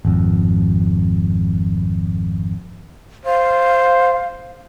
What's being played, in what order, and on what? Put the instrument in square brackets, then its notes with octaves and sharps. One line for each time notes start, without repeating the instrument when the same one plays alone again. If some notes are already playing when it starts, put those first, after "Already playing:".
[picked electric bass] G#1 F2
[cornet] C5 [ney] F5